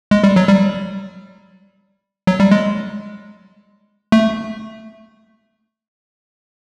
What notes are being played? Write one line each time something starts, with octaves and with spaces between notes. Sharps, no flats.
G#3
G3
F#3
G3
F#3
G3
G#3
A3